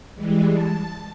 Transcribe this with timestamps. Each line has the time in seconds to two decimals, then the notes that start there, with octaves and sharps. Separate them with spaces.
0.15 E3 G3 G#3
0.49 A5